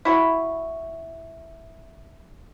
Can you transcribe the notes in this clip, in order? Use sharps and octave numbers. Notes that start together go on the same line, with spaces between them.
E4 F#4